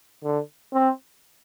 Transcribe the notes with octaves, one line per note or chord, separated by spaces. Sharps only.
D3
C4